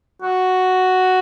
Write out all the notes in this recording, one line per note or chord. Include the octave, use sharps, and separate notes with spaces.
F#4